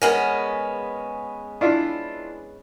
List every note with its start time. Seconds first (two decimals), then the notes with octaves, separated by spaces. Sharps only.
0.02 G#3 B3 C#4 A#4
1.61 D4 E4 F4